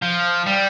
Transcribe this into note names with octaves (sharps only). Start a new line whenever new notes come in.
F3
G3